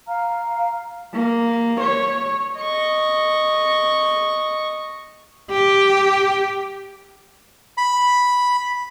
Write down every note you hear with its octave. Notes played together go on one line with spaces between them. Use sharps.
F5 A#5 F6
A#3
C#5
D#5 C#6
G4
B5